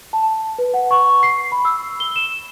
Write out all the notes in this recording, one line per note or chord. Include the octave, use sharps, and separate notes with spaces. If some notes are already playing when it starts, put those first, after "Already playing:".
A5
B4
F#5
C#6
C7
B5
E6
G7
E7